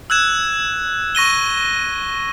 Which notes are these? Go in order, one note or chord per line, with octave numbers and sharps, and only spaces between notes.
E6 F#6 G#6 E7
C#6 A#6 D#7 G7